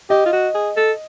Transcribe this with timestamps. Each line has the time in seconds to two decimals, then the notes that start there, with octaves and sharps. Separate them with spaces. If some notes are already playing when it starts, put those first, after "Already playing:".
0.10 G4 D#5
0.26 F4
0.33 F#4
0.55 G#4
0.76 A4